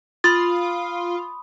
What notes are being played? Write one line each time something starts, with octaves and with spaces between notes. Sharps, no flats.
F4 B5 C6 D#6 A6